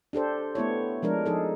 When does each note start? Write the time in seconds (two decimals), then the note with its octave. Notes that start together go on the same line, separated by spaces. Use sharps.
0.13 D4 G4 A4 C5
0.55 A3 B3 E4 C#5
1.02 F3 G#3 D4 A#4
1.26 F3 D#4 G#4 A4